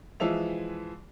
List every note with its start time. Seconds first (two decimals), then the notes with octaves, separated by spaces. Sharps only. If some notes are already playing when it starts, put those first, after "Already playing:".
0.20 E3 F3 G#3 E5 F7